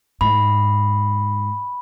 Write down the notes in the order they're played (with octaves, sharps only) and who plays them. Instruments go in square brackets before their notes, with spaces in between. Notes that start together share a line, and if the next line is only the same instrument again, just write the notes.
[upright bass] G#2 [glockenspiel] B5